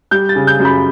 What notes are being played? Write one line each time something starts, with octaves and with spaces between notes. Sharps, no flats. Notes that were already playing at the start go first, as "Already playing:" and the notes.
G3 G6
A6
C#3
G6
F#2
B5